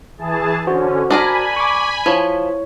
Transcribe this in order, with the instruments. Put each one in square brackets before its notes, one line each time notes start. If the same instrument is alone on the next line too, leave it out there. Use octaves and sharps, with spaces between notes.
[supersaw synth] E3 G#4 A5
[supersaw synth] D3 C#4 [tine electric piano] F#4 C5
[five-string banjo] D4 G#4 A#4 [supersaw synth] G#5 B5
[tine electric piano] C#6 D6
[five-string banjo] F3 [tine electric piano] E4 C#5